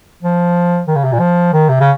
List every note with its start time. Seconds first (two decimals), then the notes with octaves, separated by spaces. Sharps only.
0.23 F3
0.87 D#3
0.96 C#3
1.04 C3
1.12 A#2
1.20 F3
1.53 D#3
1.69 C3
1.80 C#3